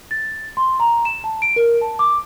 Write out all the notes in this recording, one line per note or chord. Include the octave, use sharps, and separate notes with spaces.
A6
C6
A#5
E7
A5
D7
A#4
A5
D6